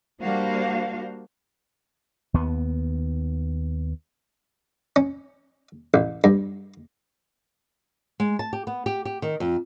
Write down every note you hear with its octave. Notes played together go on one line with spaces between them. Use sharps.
G3 A#3 D4 F#4 C5 F5
D#2 B3
C#4
A1
G2
G#3
A5
G4
B3
G4
G4
D#3
F2